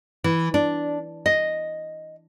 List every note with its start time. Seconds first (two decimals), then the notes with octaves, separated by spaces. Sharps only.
0.24 E3
0.54 D4
1.26 D#5